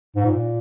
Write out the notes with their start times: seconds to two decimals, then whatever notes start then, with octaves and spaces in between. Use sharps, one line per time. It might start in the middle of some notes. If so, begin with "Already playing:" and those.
0.16 G#2
0.26 A#2